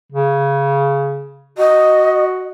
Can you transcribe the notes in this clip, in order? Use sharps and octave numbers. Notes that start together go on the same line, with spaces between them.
C#3
F#4 D#5